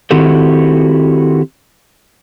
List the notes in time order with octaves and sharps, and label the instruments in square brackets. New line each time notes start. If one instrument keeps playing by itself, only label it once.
[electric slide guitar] D#3 C4 E4 F#4 G4 A4